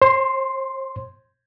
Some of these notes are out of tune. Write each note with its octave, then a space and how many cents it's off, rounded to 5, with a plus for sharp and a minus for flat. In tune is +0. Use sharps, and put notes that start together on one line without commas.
C5 +40 C6 +0